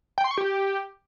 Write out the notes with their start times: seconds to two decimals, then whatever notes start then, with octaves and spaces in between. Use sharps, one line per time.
0.18 G5
0.24 C6
0.31 C#6
0.38 G4